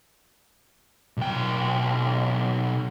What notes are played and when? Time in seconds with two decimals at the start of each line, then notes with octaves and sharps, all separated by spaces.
1.17 B1 G5